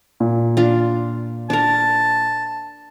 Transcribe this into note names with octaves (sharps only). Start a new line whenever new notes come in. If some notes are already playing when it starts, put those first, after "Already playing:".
A#2
D4 F4
D4 A#4 A5